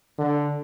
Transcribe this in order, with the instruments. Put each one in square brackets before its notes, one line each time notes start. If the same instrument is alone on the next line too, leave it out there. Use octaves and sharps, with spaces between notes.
[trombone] D3